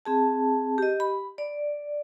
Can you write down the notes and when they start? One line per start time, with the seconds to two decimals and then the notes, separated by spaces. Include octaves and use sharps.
0.05 C4 G#4 A5
0.78 G4 D#5
1.00 B5
1.38 D5